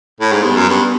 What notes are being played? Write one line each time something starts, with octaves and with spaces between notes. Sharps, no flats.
A2
G#2
G2 B3
F#2
G2